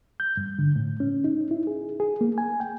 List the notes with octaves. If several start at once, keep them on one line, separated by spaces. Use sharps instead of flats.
G6
G2
D3
A2
C#4
D#4
E4
G#4
G#4
A#3
G#5
G5